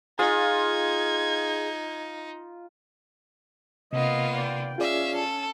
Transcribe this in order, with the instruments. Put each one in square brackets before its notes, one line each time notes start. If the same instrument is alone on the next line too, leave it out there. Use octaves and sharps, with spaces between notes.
[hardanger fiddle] D#4 [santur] F4 [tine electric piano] G#4 [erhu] G#6
[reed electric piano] C3 [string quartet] A#3 B3 F4 [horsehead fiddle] D#5
[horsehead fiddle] D5 G5
[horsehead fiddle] C#4 [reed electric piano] F4 G#4 D5 [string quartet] E5 F5
[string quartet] A4